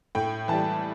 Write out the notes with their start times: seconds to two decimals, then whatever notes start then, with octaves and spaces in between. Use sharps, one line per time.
0.15 A2 G5
0.48 E3 G3 A5